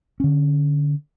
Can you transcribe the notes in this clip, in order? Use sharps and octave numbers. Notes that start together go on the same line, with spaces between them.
D3 C#4